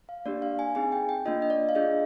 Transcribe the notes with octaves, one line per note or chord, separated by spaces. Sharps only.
F5
A#3 D4 G4 D5
F5
G#5
C4 D#4 G#4 G#5
G5
G5
A#3 D4 F4 D#5
D#5
D5
F5
D4 F4 G#4 D#5